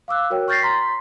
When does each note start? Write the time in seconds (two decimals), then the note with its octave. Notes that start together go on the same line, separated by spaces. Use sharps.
0.08 F5 D6 E6 F#6
0.30 F#4 A#4 C#5 G5
0.48 C#6 F6 G6 A6 A#6 C7
0.62 A#5 C6 B6